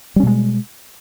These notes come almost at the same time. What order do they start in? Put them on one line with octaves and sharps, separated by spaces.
G3 C#4 B2 G#3